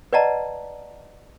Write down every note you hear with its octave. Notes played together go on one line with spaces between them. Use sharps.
B4 D5 D#5 F#5 A5 A#5